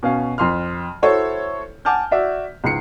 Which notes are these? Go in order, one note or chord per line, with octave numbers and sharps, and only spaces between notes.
B2 C#4 F5
F2 C6 F6
E4 F#4 A4 C5 C#5
F#5 G#5 A5 D6 F6 G6
F#4 D5 E5
C#2 G#2 C7 C#7